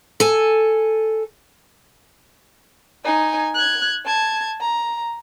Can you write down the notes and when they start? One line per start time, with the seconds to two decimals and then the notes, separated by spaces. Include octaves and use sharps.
0.20 A4 G#5
3.04 D#4 G#5
3.55 F#6 G#6
4.05 A5 G#6
4.61 A#5